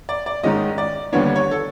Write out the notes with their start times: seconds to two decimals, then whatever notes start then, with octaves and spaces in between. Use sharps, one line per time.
0.09 D5
0.26 D5
0.43 G#2 D#3 G#3 C#4 D#5
0.78 D5
1.13 D#2 D3 G3 B3 D4 C#5
1.36 C#5
1.51 A4